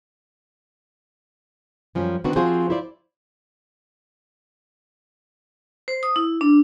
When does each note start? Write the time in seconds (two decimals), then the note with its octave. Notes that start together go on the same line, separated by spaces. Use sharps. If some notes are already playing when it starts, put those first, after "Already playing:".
1.95 F#2 F3 G3 C#4
2.24 D3 D#3 B3 C4 D4 F#4
2.36 F3 C4 F4 F#4 G#4 C5
2.70 E4 F4 C5 D5
5.88 C5
6.03 D#6
6.16 E4
6.41 D4